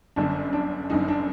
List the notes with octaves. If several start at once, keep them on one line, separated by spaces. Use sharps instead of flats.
G1 F#2 D3 D4
D4
G1 F#2 D3 D#4
D4